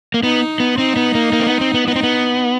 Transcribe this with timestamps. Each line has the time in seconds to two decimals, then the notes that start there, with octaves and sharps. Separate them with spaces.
0.14 A#3
0.23 B3 D#4
0.60 B3
0.78 C4 D#4
0.96 B3
1.15 A#3
1.33 A#3
1.40 C4
1.47 B3
1.61 C4
1.74 B3
1.88 B3 D#4
1.96 C4
2.03 B3